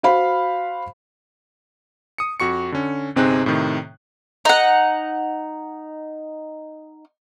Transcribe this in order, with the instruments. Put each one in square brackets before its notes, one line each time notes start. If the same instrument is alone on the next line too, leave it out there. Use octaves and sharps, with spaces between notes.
[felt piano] F#4 C5 F5 B5
[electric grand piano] D#6 C#7
F2 F#4 C#6 C#7
D3 C#4
G1 C3 C4 D#4 G#4 F#6
A2 C3 D#3
[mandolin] D#4 F#5